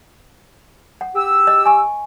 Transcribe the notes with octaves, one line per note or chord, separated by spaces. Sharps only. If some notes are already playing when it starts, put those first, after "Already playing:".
F#5
G4 E6
D#5
G#5 C#6